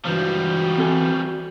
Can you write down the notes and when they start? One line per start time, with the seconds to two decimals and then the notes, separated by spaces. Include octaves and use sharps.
0.05 C#2 G2 E3 F3 G3 F#4
0.78 C4 A4 G#5